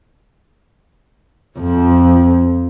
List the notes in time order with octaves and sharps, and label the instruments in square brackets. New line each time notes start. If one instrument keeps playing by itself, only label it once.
[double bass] F2 F3